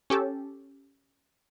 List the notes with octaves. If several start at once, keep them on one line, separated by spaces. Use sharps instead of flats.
C#4 G4 A4